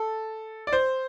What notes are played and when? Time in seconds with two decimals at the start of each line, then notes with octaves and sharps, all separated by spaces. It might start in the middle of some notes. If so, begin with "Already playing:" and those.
Already playing: A4
0.67 D5
0.73 C5